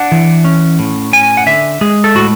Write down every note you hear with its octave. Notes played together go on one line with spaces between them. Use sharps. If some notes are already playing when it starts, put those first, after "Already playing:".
Already playing: D4 F#5
E3
C#4
A2
C#4 G#5
F#5
D3 E5
G#3 G#4
A4
A2 F#4